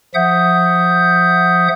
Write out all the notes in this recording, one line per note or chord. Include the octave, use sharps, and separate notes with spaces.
F3 E5 F#5 D#6 G6